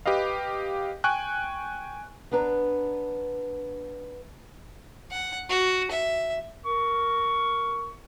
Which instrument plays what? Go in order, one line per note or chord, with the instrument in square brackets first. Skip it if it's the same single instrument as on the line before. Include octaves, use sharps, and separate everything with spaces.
[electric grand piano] G4 B4 D#5 F5
G5 G#5 C#6 F#6
[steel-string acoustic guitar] B3 D4 B4 A#5
[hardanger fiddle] F#5
F#4
E5
[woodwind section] A#4 C#6